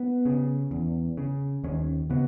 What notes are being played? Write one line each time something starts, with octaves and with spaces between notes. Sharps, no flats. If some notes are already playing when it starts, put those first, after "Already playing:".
Already playing: B3
C#3
E2
C#3
D#2 C#4
C#3 B3